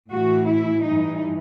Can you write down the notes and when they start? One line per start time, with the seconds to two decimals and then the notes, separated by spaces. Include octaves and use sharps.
0.10 A2 E3 F#4
0.46 E4
0.82 G2 E3 D#4